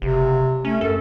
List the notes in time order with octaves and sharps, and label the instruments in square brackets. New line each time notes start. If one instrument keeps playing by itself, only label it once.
[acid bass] F#1 [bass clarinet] C3
[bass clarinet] A3 [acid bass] C#4
[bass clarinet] F#2 [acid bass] A4